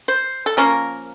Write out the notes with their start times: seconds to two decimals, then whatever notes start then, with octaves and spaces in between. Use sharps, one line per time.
0.08 C5
0.46 A4
0.57 F3 A#3 C#4 A#4